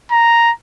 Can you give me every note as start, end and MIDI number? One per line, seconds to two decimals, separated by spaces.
0.12 0.51 82